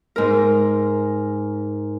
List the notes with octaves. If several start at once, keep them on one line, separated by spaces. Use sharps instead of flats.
G#2 A#4